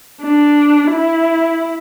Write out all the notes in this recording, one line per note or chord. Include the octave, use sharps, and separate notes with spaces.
D4
E4